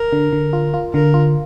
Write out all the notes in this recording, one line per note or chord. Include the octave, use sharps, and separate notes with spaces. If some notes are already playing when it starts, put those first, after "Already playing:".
Already playing: A#4
D3
D3
F4
F4
D3 A#4
F4